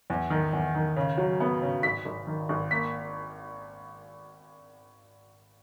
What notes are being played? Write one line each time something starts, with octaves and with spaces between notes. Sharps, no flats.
E2
D#3
E2
D#3
C#3
F#3
B3
C#3
G#1 B6
G#1
D#3
G#1
A#3 B6